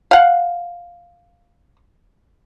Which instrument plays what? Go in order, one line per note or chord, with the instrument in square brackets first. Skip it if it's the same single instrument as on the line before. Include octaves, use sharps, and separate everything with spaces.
[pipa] F5 F#5